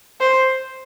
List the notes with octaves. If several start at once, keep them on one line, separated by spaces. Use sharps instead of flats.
C5